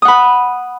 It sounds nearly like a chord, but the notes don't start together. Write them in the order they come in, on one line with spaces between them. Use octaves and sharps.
D#6 F#5 B5